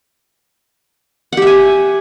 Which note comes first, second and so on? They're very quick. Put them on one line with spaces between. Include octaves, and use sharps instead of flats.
F#5 G4 E5 G#5